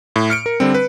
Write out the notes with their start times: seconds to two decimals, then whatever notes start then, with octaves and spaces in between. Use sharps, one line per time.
0.16 A2
0.30 F6 C#7 D7
0.46 A#4
0.60 D3 G3 C4
0.74 B4